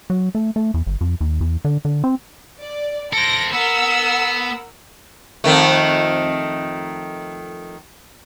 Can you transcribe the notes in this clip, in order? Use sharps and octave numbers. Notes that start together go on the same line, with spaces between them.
F#3
A3
A3
E2
G1
F2
D#2
E2
D3
D3
C4
D5
A4 C5 A#6 D7
B3 A#4 F#5 E6
F2 D#3 A3